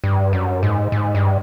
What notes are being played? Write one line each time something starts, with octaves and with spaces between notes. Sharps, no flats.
G2
F#2
G#2
G#2
G2